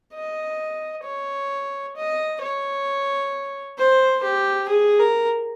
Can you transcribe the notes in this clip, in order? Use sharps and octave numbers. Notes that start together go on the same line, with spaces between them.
D#5
C#5
D#5
C#5
C5
G4
G#4
A#4